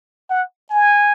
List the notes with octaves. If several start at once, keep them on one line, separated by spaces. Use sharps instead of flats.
F#5
G#5